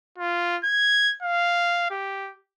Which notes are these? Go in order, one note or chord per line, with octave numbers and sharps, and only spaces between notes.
F4
G#6
F5
G4